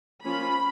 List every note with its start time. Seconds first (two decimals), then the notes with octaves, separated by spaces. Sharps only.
0.24 F3 A#3 C#4 F4 B5